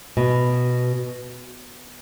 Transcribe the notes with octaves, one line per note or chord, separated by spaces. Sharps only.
B2